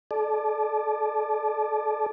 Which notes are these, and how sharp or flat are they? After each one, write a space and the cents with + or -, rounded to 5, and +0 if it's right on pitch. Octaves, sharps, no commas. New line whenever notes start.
A4 -35 D5 +20